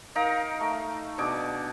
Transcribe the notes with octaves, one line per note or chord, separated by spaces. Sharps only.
D#4 A#4 F5 A#5
A3
B2 D4 G#4 D6